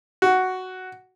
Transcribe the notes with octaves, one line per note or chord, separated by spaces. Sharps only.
F#4